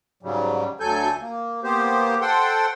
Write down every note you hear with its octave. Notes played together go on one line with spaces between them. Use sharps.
G#2 C#3 F#3 G3
D2 F#3 A4 G#5 G6
A#3
A#3 B3 G4 C5
A4 C5 F#5 G5 C6